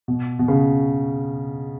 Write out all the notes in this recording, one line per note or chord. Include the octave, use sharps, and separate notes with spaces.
B2
B2
C#3